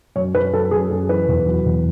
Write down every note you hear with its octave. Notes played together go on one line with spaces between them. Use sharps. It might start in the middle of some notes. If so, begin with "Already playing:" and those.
F#2 C#5
F#2 B4
F#2 A4
F#2 G#4
F#2 A4
E3 B4
E2
F#3
E2